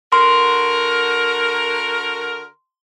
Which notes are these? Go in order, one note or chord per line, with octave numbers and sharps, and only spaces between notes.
D3 F#4 A#4 C6